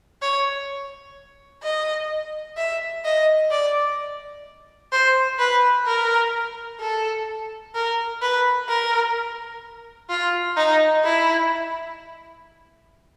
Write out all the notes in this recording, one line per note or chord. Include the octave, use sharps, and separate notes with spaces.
C#5
D#5
E5
D#5
D5
C5
B4
A#4
A4
A#4
B4
A#4
F4
D#4
E4